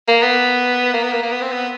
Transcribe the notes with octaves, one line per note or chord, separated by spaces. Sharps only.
A#3
B3
A#3
B3
A#3
A#3
B3
C4
B3